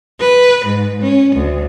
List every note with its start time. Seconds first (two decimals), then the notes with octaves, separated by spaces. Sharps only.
0.20 B4
0.65 G#2
1.01 C#4
1.35 D2